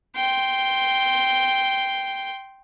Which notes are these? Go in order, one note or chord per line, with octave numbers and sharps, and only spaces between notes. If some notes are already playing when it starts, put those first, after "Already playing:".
G5 C6